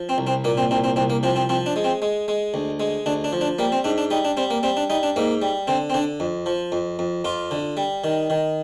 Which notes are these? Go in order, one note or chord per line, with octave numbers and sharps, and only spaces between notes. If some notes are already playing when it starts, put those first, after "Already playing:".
Already playing: F3
C4
C2
C4
A#2 A#3
C4
C2 C4
C4
C2 C4
A#3
F3 C4
C4
F3 C4
D4
G#3
C4
G#3
G#3
D2
G#3
D2 D4
D4
F3
D4
G3 A#3
C4
G#2 D4
D4
G3 D#4
D4
G3 C4
A#3
G3 C4
D4
G3 D#4
D4
G#2 A#3
G3
D3 C4
C4
D3 D4
F2
F3
F2
F2
F2 F4
D3
G3
D#3
D#3